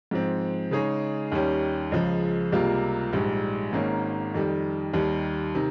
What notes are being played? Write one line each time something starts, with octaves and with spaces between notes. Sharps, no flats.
G#2 F3 C4
C#3 G#3 D#4 G#4 C#5
D#2 D#3 G3 C#4 G4
C#2 C#3 F3 G#3
C#2 C3 G3 A#3 F4
A#1 G#2 G3
G#1 G#2 D#3 A#3 C#4
F2 D#3 G3
D#2 D#3 G3
C3 D#3